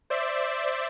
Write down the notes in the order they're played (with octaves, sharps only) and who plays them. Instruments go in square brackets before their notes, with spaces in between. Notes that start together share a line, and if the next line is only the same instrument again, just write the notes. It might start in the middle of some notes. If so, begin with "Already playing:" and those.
[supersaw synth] C5 D5 E5